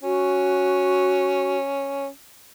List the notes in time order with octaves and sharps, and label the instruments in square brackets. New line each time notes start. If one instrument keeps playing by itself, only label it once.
[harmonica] C#4 [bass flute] F#4